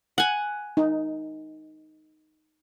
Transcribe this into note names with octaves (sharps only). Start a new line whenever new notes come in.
F#5 G#5
D#4